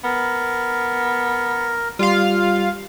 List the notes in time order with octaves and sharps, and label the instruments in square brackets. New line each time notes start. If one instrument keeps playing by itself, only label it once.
[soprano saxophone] B3 [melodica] A#4
[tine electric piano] G3 G4 [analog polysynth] F4 F5